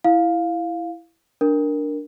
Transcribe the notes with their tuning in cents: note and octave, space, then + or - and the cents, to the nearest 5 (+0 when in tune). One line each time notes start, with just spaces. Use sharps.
E4 +5 F5 +10
D4 +0 A#4 +0